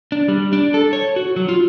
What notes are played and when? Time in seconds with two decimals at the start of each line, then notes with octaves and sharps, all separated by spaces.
0.12 D4
0.28 G3
0.53 D4
0.74 A4
0.93 C#5
1.16 F#4
1.36 F#3
1.49 F4